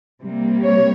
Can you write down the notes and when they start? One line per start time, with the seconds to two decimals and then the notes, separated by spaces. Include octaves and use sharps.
0.23 C3 G3 A#3
0.64 C#5